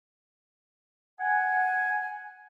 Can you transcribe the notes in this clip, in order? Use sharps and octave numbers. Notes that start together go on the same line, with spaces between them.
F#5 G#5